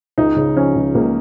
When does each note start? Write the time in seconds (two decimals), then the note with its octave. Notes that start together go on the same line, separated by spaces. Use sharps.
0.18 C#2 D#4
0.37 C#3
0.56 F3 C#4
0.75 C#2
0.95 C#2 A#3